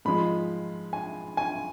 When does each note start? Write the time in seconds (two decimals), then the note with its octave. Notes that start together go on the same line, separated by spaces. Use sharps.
0.05 G#2 F3 G#3 B5
0.93 G#5
1.37 G#5